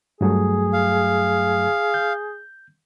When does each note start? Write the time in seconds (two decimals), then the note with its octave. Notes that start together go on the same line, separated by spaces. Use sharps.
0.21 G2 F#3 A3 G#4
0.73 F5
1.94 G6